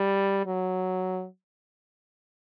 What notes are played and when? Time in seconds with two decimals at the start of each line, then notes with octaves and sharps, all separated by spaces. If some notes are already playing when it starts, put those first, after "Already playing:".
Already playing: G3
0.46 F#3